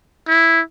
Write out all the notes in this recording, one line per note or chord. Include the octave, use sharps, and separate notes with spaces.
E4